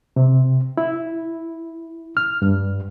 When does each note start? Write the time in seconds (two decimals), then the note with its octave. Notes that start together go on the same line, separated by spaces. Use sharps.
0.16 C3
0.77 E4
2.17 F6
2.42 G2